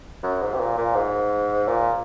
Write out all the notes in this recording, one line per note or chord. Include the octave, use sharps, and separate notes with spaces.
F#2
G#2
C3
A#2
A#2
G#2
A#2